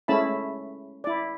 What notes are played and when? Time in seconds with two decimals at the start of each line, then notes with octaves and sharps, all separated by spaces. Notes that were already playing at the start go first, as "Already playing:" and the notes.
0.08 G#3 A3 C#4 E4 A5 B5
1.04 E4 D5